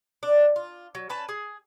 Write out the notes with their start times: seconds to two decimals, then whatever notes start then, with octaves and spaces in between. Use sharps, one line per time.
0.23 D4
0.56 F4
0.95 F#3
1.09 C#4 B4 A5
1.29 G#4